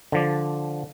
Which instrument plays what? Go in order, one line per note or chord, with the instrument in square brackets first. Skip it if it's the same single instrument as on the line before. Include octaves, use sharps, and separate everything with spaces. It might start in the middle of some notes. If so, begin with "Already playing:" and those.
[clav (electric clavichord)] D3 F3 D5